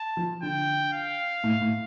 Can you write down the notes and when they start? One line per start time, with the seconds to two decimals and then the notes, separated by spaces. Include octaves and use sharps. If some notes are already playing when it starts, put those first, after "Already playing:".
Already playing: A5
0.17 F3
0.42 D3 G5
0.93 F5
1.44 A2
1.61 A2